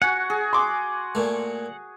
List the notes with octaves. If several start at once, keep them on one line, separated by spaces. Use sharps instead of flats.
F#4 F#5 G#5
G#4
C6 D6
A#2 A3